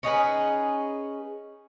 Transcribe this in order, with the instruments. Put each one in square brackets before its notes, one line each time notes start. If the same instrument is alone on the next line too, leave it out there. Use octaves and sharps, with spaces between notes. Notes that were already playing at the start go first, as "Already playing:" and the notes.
[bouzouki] C#4 D#4 G#4 B4